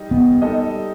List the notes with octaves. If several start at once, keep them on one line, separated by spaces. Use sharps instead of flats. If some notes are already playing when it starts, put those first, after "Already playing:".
Already playing: G3 D#4 D#5
B3
G3 D#4 A4 D#5